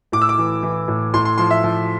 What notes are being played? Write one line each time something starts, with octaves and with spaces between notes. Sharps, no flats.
A2 D6
E6
D6
E3
E3
A2
A2 C6
C6
F3 C6
E5
F3